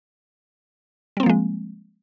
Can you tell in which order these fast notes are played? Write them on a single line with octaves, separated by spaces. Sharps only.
G3 C4 A#3 F3 G#3